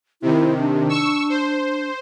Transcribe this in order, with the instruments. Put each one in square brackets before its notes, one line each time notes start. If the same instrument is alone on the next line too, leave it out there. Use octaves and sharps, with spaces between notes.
[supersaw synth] C3 D#3 [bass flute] E4
[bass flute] D4
[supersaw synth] C#6 E6
C5